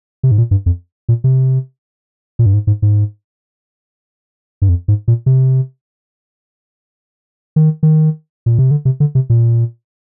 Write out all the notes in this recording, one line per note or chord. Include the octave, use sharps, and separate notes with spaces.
C3
G#2
A#2
G2
F2
A#2
C3
A#2
G2
G#2
G#2
G#2
G2
F2
G#2
A#2
C3
D#3
D#3
A#2
C3
D3
C3
D3
C3
A#2